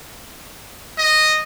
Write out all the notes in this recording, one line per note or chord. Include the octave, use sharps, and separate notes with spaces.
D#5